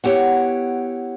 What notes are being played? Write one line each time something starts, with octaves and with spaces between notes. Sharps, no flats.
B3 E4 G4 C#5 F#5